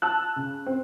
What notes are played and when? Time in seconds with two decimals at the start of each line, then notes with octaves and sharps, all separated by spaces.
0.02 A5 E6 F#6
0.36 C#3
0.67 C4